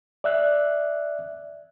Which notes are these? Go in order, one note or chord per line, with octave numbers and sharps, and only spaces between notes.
D5 E5 F#6